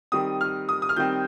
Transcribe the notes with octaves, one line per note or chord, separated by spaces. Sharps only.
D#3 G3 C4 D#6
F6
D#6
D#6
F6
D#3 G3 C4 G6